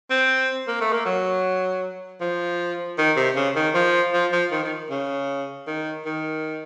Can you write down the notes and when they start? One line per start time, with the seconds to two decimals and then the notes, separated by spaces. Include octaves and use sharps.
0.10 C4
0.68 A#3
0.81 A3
0.93 A#3
1.06 F#3
2.21 F3
2.98 D#3
3.17 C3
3.36 C#3
3.55 D#3
3.74 F3
4.13 F3
4.32 F3
4.51 D#3
4.64 D#3
4.90 C#3
5.67 D#3
6.05 D#3